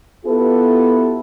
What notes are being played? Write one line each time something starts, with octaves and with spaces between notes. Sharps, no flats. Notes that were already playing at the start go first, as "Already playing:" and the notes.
B3 E4 F4 G4 A4 B4